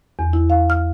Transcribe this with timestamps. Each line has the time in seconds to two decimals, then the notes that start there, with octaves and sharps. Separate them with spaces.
0.19 E2
0.33 E4
0.50 F5
0.70 F6